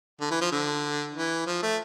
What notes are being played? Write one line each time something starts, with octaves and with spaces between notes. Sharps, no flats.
D3
E3
F3
D3
E3
F3
A3